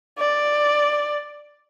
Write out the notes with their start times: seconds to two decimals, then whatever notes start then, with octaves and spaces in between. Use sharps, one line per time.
0.18 D5